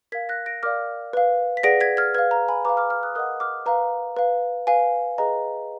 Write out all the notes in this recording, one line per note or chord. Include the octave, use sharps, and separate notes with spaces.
A#4 F5 G#6 B6
F#6 A#6
A#6 D7
A#4 D5 F5 D6 F6
B4 F5
B6
G#4 B4 D5 F#5 A#6 D7
G#6 B6
F6 G#6
B4 F5 F6 G#6
A#5
G#5 B5
B4 F5 A#5 D6
D6 F6
D6 F6
D#6 F#6
A#4 D#5 F#5 D#6 F#6
D6 F6
B4 F5 A#5
B4 F5
B4 F5 G#5
G#4 B4 D#5 A#5